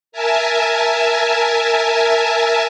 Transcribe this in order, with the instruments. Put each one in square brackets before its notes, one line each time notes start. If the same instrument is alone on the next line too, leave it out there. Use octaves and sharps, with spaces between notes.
[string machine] A#4 E5 G#5 A5